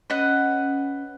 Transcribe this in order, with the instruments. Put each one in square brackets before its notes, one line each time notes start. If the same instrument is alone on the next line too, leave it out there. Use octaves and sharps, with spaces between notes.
[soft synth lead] C#4 [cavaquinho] B4 D#5 F#5